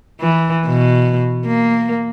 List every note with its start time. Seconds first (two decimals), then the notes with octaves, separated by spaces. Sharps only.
0.20 E3
0.66 B2
1.46 A#3